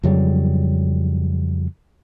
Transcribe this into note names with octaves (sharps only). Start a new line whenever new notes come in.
F2 C#3 F#3 G3